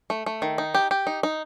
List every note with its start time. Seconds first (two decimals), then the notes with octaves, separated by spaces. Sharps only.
0.10 A3
0.26 A3
0.42 D#3
0.58 D#4
0.75 G4
0.91 G4
1.07 D#4
1.23 D#4